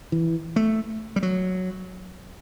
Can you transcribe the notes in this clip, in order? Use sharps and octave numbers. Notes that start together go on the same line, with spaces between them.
E3
A3
G3
F#3